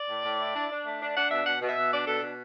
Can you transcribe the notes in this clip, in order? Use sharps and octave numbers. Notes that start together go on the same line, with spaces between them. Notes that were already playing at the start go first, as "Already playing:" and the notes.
Already playing: D5
A2
A2
E4
D4
D4
A3
D4
D4 F#5
B2 E5
B2 F#5
B2
E5
B2
D4 D5
B2 A4
B2